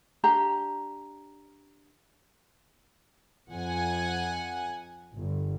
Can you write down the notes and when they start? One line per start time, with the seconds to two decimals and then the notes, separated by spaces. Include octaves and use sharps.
0.24 D4 G4 A#5
3.51 F2 F#5 G#5
5.15 G1